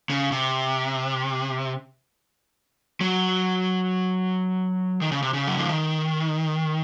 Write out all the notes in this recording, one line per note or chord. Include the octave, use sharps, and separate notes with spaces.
C#3
C3
F#3
D#3
C#3
C3
C#3
F#3
F3
D#3